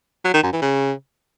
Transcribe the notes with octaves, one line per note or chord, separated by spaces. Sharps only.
F#3
D#3
F#2
E3
C#3